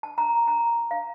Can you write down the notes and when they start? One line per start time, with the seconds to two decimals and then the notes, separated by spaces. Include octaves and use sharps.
0.03 A5
0.18 A#5
0.48 A#5
0.91 F5